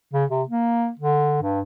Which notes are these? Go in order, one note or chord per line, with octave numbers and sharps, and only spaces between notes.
C#3
C3
A#3
D3
G2